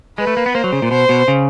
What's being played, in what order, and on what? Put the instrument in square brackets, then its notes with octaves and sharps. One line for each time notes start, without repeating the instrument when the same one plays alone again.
[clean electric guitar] G#3 [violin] B4
[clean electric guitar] A3
A#3
B3
[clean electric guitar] A#3 [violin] C5
[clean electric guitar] F#3
C#3
A#2
[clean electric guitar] B2 [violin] C5
[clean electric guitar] B2
C#3